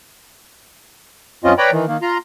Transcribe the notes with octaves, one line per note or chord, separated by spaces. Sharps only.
F#2 C4 C#4 F4 D#5
B4 C#5 D5 G5 A#5 B5
D#3 E3
D#3 A#3
F4 A#5 C6